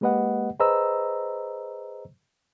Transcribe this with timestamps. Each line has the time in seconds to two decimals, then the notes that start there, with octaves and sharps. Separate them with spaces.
0.01 G#3 A#3 G4 B4 D#5 F#5
0.60 G#4 B4 C5 D#5 A#5 E6